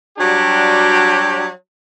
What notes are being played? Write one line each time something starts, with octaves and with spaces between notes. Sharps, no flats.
F#3 G3 D4 F#4 G4